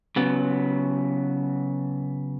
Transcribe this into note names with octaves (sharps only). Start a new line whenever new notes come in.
C#3 F#3 B3